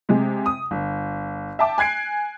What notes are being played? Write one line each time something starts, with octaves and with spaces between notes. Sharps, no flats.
C3 G#3
D#6
G1
E5 G5 A5 D6
G#5 F#6 G#6 C7 D7